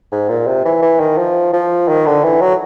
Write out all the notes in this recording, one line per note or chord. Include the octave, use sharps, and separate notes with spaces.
G#2
A#2
C3
E3
E3
D#3
F3
F3
D#3
D3
E3
F#3